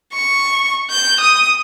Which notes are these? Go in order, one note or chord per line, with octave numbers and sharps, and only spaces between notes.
C#6
G6
D#6